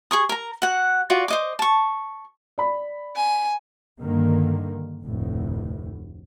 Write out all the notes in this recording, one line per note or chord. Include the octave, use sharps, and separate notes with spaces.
G#4 C#6 D#6
A#4 A#5
F#4 F#5
F4 F#4 D5
C5 D#5 D6
A5 C#6
D5 B5
G#5
G2 D3 D#3 A#3
F1 D2 A2